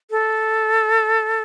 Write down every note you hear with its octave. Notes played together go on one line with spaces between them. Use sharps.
A4